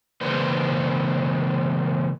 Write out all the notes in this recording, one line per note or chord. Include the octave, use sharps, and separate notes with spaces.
C#3 E3 A#3 B4 C5